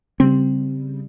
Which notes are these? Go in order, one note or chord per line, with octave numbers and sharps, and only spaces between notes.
C#3 G3 C4